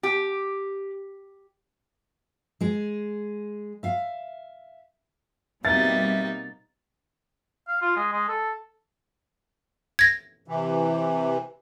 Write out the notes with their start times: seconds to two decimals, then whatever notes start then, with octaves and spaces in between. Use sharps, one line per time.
0.03 G4
2.60 G#3 G#4
3.83 E5 F5
5.65 B2 G3 A#3 C4 D#4 E5 A6
7.68 F5
7.82 F4
7.96 G#3
8.12 G#3
8.28 A4
9.99 G#6 A#6
10.48 C3 E3